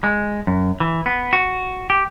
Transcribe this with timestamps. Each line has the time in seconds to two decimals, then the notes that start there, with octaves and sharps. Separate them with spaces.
0.04 G#3
0.47 F#2
0.80 E3
1.06 B3
1.33 F#4
1.90 G4